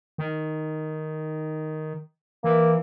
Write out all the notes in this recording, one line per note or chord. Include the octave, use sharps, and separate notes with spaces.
D#3
E3 A#3